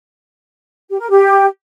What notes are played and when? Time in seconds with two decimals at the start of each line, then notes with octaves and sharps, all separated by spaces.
0.90 G4
1.00 A#4
1.09 G4